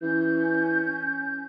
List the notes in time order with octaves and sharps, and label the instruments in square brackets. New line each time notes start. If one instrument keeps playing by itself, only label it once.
[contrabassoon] E3 [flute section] C#4 G6